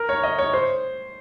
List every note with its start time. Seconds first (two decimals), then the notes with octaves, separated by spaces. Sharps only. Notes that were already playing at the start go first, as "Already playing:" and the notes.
Already playing: A#4
0.09 C#5
0.23 D#5
0.38 C#5
0.54 C5